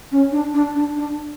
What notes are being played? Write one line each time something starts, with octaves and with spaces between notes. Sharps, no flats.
C#4
D4
D4
D4
D4